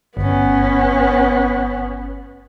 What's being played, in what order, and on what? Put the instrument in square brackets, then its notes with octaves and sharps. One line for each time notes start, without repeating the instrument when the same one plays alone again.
[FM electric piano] G1 [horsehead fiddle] B3 C#4